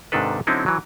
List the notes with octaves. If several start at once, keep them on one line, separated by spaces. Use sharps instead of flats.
G#2 C3 D#3 D4 A4 B4
D3 F#3 C4 C#4 D#4 E4
E3 F#3